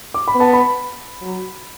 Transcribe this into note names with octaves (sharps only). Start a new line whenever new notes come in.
D6
B5
B3
A5
B5
F#3